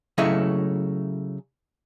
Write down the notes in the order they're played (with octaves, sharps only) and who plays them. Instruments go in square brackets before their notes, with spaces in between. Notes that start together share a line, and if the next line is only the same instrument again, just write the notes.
[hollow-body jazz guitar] C#3 F#3 A3 E4 C#5 D#5